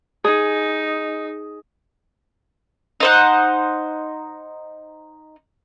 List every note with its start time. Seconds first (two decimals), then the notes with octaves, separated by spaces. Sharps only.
0.24 D#4 G#4
3.00 D#4 C5 F#5